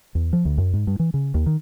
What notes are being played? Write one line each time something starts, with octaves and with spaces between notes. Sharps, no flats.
E2
F3
D2
F#2
G#2
G2
E3
C#3
D#2
D#3